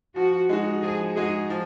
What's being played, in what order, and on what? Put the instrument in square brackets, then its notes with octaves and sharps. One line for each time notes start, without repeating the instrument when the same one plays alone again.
[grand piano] F3 [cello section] F#4
[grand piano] G#3 D#4 F#4
[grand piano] F3 [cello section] G#4
[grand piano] G#3 D#4 F#4 [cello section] G#4
[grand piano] F3